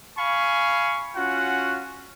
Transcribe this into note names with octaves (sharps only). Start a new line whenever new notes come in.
F5 G#5 B5 C#6
C#4 F4 F#4 F#5